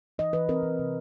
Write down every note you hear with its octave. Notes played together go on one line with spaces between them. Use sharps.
E3 D#5
E3 B4
C4 A#4
E3
C3